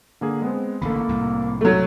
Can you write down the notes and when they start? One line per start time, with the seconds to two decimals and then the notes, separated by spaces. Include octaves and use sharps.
0.21 D3 A#3 G#4
0.42 G#3 B3 C4
0.82 A1 D3 A#3 A4 B5
1.09 C2 A2
1.61 F#3 A3